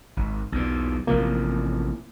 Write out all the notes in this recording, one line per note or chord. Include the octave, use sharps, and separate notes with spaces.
G#1
B1 E2 A#2
A1 C3 F3 A#3